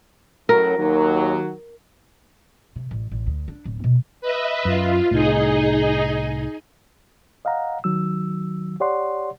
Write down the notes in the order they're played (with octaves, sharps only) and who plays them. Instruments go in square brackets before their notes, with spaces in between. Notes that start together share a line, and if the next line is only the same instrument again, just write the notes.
[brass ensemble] F#2 A2 F#3 [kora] A#4
[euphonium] D#2 [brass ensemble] D#3 F#3
[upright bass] C3
A1
A1
D2
D4
D1
B2
[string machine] B4 D#5 E5
[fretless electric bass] F#2 [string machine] F4
[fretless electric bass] C2 A2 [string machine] D#4 G#4 D#5
[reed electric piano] D#5 F5 F#5 A#5
D#3 F#3 E6
G4 C#5 D5 F#5 C6